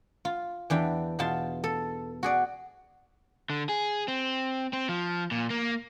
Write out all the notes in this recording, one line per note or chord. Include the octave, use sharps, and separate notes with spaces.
F4
E2 E3 D4 G5
E2 B2 F4 A5 C6
A4
F#4 G#4 D5
D3
G#4
C4
C4
F3
A#2
A#3